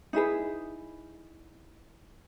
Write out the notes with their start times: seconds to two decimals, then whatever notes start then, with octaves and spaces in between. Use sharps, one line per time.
0.13 D#4 E4 G#4 B4